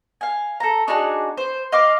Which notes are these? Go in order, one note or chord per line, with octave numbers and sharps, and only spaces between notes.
F5 G#5
A4 A#5
D4 D#4 F#4 G#4
C5
D#5 F5 C6 D6